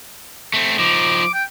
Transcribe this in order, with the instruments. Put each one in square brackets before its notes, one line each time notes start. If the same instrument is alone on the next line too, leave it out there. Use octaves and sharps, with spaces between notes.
[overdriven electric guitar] A3 C4
[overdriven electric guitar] F3 D#4 [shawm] D6
[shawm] G5